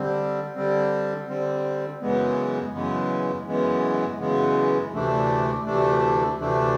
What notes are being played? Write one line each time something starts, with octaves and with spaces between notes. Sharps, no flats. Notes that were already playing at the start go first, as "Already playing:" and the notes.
Already playing: D3 G3 C4
D3 G3 C4
D3 G3 C4
F#2 C#3 E3 G#3 B3
F#2 C#3 E3 G#3 B3
F#2 C#3 E3 G#3 B3
F#2 C#3 E3 G#3 B3
D2 C3 E3 A3 D4
D2 C3 E3 A3 D4
D2 C3 E3 A3 D4